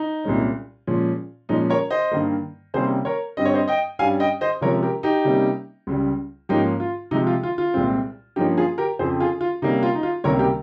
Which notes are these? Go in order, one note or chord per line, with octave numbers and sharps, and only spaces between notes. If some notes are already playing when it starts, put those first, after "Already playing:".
Already playing: D#4
C2 A#2 G#3 C#4
A#2 F3 G#3 C#4
A#2 F3 G#3 C#4 D#4
A#4 C#5
C5 D#5
G2 D#3 A#3
C3 D#3 G3 A#3 C#4 G#4 C5
A#4 C#5
G2 G3 C4 D#5
C#5
C5 D#5
D#5 G5
G2 G3 C#4 F5 G#5
D#5 G5
C5 D#5
C3 F3 G#3 C#4 A#4 C#5
G4 A#4
D#4 G4
C3 G3 A#3 C#4
C#2 C#3 G3
G#2 F3 A#3 C#4 D#4 G4
F4
C3 F3 G#3 D#4
F4
F4
F4
C2 A#2 G#3 C4
G2 F3 A#3 C#4 D#4 G4
F4 G#4
G4 A#4
F2 C#3 F3 C4 G#4 C5
F4 G#4
F4
C3 G3 A#3 C#4 D#4
F4
D#4
F4
C#2 C3 D#3 G3 A#3 A#4 C#5
G4 A#4